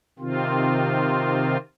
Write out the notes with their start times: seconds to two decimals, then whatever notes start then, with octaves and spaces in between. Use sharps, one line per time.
0.19 C3 D#3 C4 F4